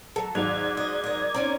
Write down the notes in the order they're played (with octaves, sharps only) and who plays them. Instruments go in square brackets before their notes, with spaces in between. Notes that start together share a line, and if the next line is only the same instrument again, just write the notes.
[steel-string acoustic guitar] F#3 [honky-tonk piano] A4
[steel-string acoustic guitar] D#2 [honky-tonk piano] G#2 F#3 F7 [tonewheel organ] D5 G#6
[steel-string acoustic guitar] D#5
A#4 D#5
[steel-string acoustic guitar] C4 C#4 D#4 [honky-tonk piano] A#5 D#7